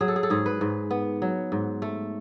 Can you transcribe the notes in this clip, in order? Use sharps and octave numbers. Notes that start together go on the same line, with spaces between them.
F#3 G#4
A4
G#4
A4
G#2 G#4
B4
G#2
B3
F#3
G#2
A3